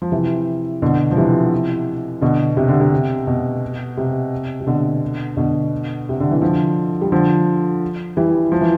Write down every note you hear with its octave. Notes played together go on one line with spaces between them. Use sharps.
F3
C3 E3
B2 D3
F3
C3 E3
B2 D3
C3
D3
C3
B2
C3
C3
B2 D3
B2 D3
C3
D3
E3
D3 F3
G3
D3 F3
E3 G3
F3
E3